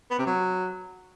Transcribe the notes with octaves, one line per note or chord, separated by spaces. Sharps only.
B3
C3
F#3